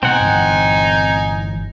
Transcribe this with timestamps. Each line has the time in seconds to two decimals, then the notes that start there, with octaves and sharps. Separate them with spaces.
0.03 B2 C4 D#4 F#5 G#5
0.21 G1 E3